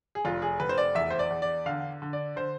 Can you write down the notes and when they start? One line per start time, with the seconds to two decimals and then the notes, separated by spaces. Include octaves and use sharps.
0.15 G#4
0.25 F1 F4
0.42 G#4
0.60 F1 B4
0.69 C5
0.78 D5
0.95 E2 E5
1.11 C5
1.19 D5
1.30 E2
1.42 D5
1.66 D3 F5
2.02 D3
2.13 D5
2.36 D3 C5